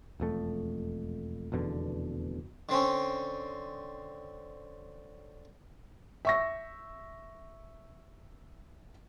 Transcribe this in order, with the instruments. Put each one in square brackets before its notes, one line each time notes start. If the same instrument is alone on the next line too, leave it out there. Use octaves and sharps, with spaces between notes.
[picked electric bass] E1 F2 A3
F1 E2 B2 D3
[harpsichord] D3 C4 C#4
[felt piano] E5 C#6 A#6